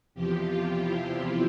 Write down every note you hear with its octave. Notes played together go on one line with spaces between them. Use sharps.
E2 C3 F3 G4
F4
E4